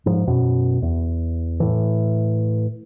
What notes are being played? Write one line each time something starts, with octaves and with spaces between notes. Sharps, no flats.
G#2 F3
F#2 B2
E2
A2 E3